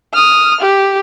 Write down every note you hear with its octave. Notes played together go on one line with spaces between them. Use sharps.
D#6 F6
G4